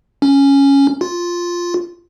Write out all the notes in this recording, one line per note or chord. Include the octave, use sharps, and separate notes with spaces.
C#4
F4